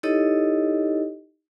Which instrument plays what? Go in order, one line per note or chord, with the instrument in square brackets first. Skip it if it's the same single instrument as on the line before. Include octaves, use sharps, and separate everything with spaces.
[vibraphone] D#4 E4 G4 A4 C#5 D#5